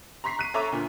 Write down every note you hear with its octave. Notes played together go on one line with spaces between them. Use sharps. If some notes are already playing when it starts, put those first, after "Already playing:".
A#5 C6 C#6 B6 C7
F#6 D#7
A4 C#5 E5 A#5 D6
D2 A#2